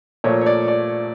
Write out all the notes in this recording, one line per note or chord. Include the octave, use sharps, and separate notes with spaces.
A#2 F3 A3 C#5
C#5
D5
D5